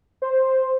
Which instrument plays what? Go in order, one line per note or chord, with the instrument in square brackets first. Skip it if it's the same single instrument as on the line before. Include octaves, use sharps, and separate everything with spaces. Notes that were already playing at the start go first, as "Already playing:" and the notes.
[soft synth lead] C5